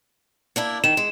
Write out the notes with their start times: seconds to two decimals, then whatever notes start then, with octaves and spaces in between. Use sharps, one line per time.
0.56 A#3 D4 E4
0.84 D#3 E7
0.97 G#3